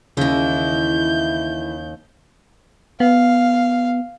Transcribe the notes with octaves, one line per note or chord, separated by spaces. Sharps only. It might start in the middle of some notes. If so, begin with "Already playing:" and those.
D#2 C#3 E3 E4 G6
B3 F5